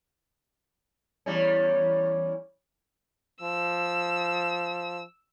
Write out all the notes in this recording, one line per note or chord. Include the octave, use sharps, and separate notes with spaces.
E2 G3 C#4
F3 E6